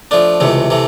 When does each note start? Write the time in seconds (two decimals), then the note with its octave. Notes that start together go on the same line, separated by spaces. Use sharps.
0.11 F3 A3 D4
0.40 C#2 C3 E3 A3
0.70 C3 E3 A3